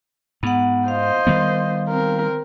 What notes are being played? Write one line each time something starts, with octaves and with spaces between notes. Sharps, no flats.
G#2 B3 F#5
C5 D#5 F5
D#3 G3 B3
C4 A#4